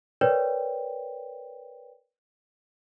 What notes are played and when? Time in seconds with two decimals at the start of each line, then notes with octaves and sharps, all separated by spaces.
0.21 A#4 B4 C#5 D5 G5